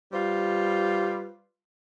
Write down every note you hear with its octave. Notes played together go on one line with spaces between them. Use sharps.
G3 F4 B4 C5